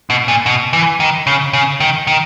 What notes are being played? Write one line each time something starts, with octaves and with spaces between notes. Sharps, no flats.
B2
A#2
B2
E3
D#3
C#3
C#3
D#3
D#3